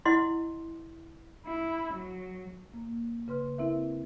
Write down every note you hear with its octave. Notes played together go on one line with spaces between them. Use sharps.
E4 D#5 F#5 C6
E4
F#3
A#3
C#3 B4 C6 F6
C4 E4 A#4 E5